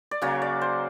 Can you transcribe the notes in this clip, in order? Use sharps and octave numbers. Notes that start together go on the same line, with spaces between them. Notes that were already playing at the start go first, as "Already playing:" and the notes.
D5
C#3 F#3 A#3 C#5
D5
C5